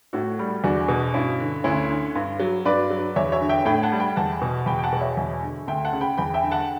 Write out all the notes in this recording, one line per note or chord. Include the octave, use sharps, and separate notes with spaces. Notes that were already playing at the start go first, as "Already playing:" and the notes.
A2 F#4 A4
G3
E2 D4 F#4
B2
G2 C#4 E4
D3
D2 C#4 E4
D3
G2
F#3
G2 B4 D5
F#3
E2 C#5 E5
C#5 E5
D3
E5 G5
A2 G5 B5
F#5 A5
G3
G5 B5
E2 F#5 A5
B2
E2 G5 B5
G5
F#5 A5
B2
C#5 E5
E2
D3
D2 E5 G5
F#5 A5
C#3
G5 B5
E2 G5 B5
E5 G5
D3
F#5 A5